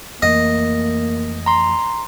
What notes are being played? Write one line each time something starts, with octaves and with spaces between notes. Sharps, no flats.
F2 E3 A3 A#3 D#5
A#5 C6